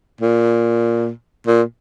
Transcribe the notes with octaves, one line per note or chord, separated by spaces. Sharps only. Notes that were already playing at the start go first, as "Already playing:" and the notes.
A#2
A#2